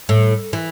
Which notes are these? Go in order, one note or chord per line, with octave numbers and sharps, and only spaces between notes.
A2
E3